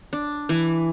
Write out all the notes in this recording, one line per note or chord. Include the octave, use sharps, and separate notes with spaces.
D4
E3